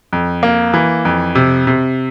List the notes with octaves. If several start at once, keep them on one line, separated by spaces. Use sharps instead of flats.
F2
A#3
E3
F2
C3
C3